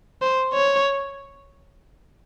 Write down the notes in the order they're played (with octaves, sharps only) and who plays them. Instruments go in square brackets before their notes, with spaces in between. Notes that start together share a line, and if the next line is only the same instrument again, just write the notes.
[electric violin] C5
C#5